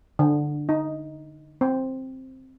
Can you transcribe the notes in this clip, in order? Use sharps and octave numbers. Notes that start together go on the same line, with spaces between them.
D3
D#4
C4